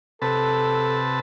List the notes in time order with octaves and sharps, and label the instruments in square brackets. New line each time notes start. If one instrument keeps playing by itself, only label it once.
[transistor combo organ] C3 B4 A5 [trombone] A4